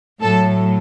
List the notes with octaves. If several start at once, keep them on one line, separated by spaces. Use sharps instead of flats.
A2 F#3 A4